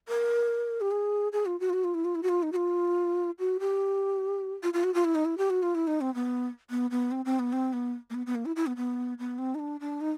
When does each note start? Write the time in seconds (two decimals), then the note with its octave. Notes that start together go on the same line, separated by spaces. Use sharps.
0.08 A#4
0.81 G4
0.91 G#4
1.32 G#4
1.46 F4
1.60 F#4
1.70 F4
1.73 F#4
1.84 F4
1.94 E4
2.04 F4
2.15 E4
2.23 F#4
2.29 F4
2.43 D#4
2.52 F#4
2.56 F4
3.39 F#4
3.60 G4
4.63 F4
4.73 F4
4.84 F#4
4.94 F4
5.05 E4
5.15 D#4
5.25 E4
5.38 G4
5.50 F#4
5.63 F4
5.75 E4
5.87 D#4
6.01 C4
6.15 B3
6.70 B3
6.91 B3
7.11 C4
7.25 C4
7.39 B3
7.53 C4
7.73 B3
8.10 A#3
8.14 B3
8.26 B3
8.35 A#3
8.46 E4
8.56 E4
8.66 B3
8.77 B3
9.19 B3
9.38 C4
9.55 D#4
9.59 D4
9.80 D4
10.01 D#4